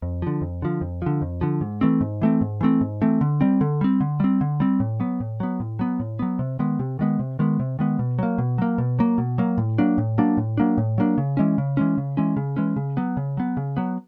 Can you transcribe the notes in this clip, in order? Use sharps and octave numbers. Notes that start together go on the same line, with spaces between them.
F2
D3 F3
F2
D3 F3
F2
D3 F3
F2
D3 F3
G#2
E3 A3 C4
G#2
E3 A3 C4
G#2
E3 A3 C4
G#2
E3 A3 C4
D3
G3 C4
D3
G3 C4
D3
G3 C4
D3
G3 C4
A2
F#3 B3
A2
F#3 B3
A2
F#3 B3
A2
F#3 B3
C3
D#3 G#3 B3
C3
D#3 G#3 B3
C3
D#3 G#3 B3
C3
D#3 G#3 B3
B2
F#3 A#3
B2
F#3 A#3
B2
F#3 A#3
B2
F#3 A#3
A2
F#3 A#3 D4
A2
F#3 A#3 D4
A2
F#3 A#3 D4
A2
F#3 A#3 D4
C#3
E3 G#3 C#4
C#3
E3 G#3 C#4
C#3
E3 G#3 C#4
C#3
E3 G#3 C#4
C#3
F#3 B3
C#3
F#3 B3
C#3
F#3 B3